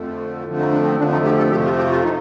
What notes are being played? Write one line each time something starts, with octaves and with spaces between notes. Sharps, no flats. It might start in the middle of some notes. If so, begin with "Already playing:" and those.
Already playing: F2 D3 F3 A3
F2 D3 F3 A3
D#4
D4
C4
F2 D3 F3 A3 D4
D#4
G4
A4
F2 C3 F3 A3 G4
F4
G4
F4
D#4